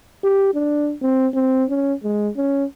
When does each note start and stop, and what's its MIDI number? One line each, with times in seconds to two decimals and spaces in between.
0.23 0.51 67
0.54 0.94 62
1.01 1.27 60
1.34 1.64 60
1.69 1.93 61
2.04 2.29 56
2.36 2.64 61